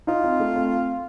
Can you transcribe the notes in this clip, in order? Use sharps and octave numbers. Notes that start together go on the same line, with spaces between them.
D#4 F4
C4
A3
C4